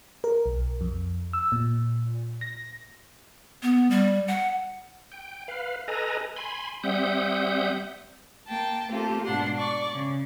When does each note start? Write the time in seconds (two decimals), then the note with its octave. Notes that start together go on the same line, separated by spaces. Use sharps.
0.24 A#4
0.46 B1
0.81 F2
1.33 E6
1.52 A#2
2.41 A#6
3.63 B3
3.90 G3
4.28 F#5
5.12 G5
5.48 B4 F5
5.88 A4 B4 D#5 G#5 A#5
6.36 G#5 B5 C6
6.84 G3 C4 E5 F#5 D#6 G6
8.48 A#3 G5 A5
8.90 A3 A#3 C4 F4 G4 A4
9.26 G#2 B2 D4 F#5 C6
9.58 D5 C#6 D6
9.93 C#3